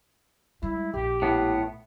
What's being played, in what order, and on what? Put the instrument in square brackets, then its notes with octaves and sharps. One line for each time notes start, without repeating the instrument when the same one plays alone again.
[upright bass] G3 G#3 [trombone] E4
[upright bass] A#1 [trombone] G4
[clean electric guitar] A2 B3